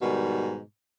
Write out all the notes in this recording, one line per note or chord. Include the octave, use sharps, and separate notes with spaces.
G#2 B2 D#3 G3